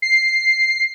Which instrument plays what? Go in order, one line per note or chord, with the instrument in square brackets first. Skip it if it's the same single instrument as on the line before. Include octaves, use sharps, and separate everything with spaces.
[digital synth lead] C7